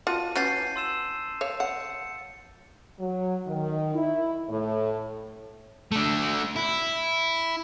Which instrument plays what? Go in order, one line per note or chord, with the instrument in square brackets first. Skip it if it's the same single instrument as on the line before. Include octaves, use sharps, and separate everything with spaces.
[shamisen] F4 F#4 [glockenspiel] A5 D#7
[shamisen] E3 C#4 F#4 [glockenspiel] G6 A6 C7
[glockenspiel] C6 E6 E7
[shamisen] C#5 F5
[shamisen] F#5 [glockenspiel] C#7
[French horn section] F#3
D#3
E4
A2
[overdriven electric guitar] A3 D4
E4